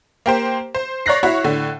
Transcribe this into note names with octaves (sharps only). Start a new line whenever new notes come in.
A#3 G4 C5
C5
C#5 D5 F#6 A#6 C7
E4 F#4 C#5
A2 D3